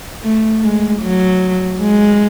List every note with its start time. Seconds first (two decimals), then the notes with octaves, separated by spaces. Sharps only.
0.23 A3
0.63 G#3
1.01 F#3
1.80 G#3